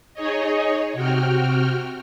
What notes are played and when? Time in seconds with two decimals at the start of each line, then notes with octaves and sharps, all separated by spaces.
0.14 D#4 G#4 C#5 D#5
0.93 C3 F#4 G5 F6